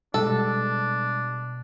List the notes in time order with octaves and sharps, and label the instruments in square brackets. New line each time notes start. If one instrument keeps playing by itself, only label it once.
[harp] B2 [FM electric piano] G3 G#3 [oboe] D4 [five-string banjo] A4